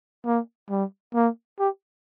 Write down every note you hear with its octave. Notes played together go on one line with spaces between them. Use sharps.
A#3
G3
A#3
G4